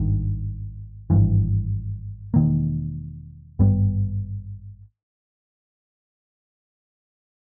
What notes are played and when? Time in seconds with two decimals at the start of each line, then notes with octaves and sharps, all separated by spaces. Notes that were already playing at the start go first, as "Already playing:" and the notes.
Already playing: G#1 G2 D#3
1.10 G#1 G2 E3
2.34 E1 E2 D#3 A#3
3.59 G#1 G2 G3 B3